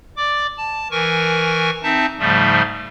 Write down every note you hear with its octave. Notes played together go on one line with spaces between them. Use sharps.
D5 D6
A5
E3 A#4 G#5 C#6
C4 D#4 E5 A5
G#2 C#3 F3 G3 A3